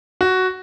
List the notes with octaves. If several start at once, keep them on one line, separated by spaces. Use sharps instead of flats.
F#4